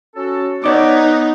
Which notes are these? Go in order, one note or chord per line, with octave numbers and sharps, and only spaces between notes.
C#4 F#4 A4
B3 D#4 C#5 D5 D6